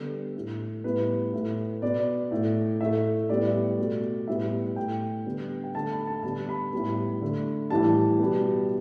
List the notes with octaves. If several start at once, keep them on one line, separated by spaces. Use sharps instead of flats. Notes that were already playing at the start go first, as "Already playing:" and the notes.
Already playing: D3 G3 B3 A4
A2 A3
A2 G3 B3 B4
A2 A3
B2 B3 D5
A2 A3
A2 A3 E5
A2 G3 B3 D5
B2 A3
A2 G3 B3 E5
A2 A3 G5
D3 G3 B3
G5
D3 A3 A5
B5
A5
D3 G3 B3 A5
B5
A2 G3 B3
D3 A3
A2 E3 G3 A5
B2 G3 B3